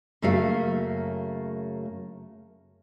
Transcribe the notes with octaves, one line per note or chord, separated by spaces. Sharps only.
F#2 C#3 A3 A#3 F#4 F5